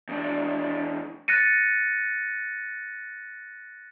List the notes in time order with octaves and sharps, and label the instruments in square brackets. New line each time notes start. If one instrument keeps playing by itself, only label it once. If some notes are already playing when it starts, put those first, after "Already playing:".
[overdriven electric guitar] E2 D4
[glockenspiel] F#6 A6 A#6 C#7 D#7